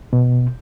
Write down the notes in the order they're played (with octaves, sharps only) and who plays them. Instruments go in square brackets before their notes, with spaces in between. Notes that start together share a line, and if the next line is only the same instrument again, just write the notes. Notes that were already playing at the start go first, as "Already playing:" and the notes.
[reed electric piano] B2